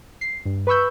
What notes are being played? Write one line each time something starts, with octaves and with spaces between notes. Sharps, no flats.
C7
G2
B4 B5 C#6 E6 G6